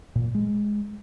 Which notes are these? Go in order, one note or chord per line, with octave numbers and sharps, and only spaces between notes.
A#2
G#3